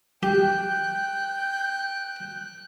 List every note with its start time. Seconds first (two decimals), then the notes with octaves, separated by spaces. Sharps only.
0.23 G4 G5 F#6 G6